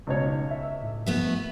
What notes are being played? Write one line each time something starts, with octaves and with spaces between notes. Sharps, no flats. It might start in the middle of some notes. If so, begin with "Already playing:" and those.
C#2 B2 D#4 C#5
E5
A2
F3 A3 B3 E5